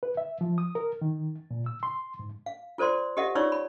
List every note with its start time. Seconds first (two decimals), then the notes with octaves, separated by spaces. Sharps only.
0.03 B4
0.17 E5
0.41 F3
0.58 D#6
0.75 A#4
1.01 D#3
1.51 A#2
1.66 E6
1.83 C6
2.19 G#2
2.46 F5
2.78 F4 A4 C5 D5 C6
3.17 G4 A4 D#5 E5 F#5
3.35 D#4 F4 C#5 D5 C#6 E6
3.52 B5